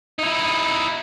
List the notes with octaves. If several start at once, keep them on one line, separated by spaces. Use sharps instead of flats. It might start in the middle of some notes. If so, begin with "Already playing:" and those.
D#4 E4